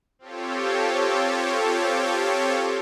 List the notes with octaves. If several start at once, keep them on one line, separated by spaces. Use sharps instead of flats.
C4 F4 G4 A4 C#5